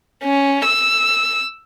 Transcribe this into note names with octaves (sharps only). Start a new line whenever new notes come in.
C#4
E6